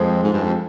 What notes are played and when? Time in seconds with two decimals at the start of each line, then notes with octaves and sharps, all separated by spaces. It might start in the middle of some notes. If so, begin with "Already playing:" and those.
Already playing: F2 F3 G#3
0.24 G#2
0.33 G2
0.43 F2